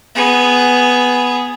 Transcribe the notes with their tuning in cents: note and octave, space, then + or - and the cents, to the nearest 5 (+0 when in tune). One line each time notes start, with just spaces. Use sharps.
B3 +0 G#4 +0